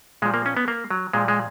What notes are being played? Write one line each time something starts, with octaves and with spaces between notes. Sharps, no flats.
A#2 F3 G#3
A#3
C#4
B3
A#3
F#3
A#2 F3 G#3
G#3